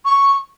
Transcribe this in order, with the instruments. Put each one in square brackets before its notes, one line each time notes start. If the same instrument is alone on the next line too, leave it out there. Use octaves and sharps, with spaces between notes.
[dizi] C#6